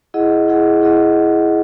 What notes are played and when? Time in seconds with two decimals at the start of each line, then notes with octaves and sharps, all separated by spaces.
0.14 E4 G#4 D#5 F#5
0.48 E4 G#4 D#5 F#5
0.82 E4 G#4 D#5 F#5